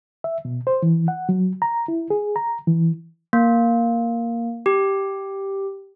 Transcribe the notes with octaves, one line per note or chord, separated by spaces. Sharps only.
E5
B2
C5
E3
F#5
F#3
A#5
E4
G#4
A#5
E3
A#3
G4